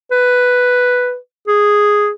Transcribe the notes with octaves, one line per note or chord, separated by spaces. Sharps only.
B4
G#4